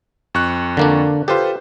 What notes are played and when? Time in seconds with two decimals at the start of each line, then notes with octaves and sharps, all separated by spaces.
0.34 F2 C#6 F#6
0.77 D3 A#3 D4
1.28 F4 G4 A4 B4 C5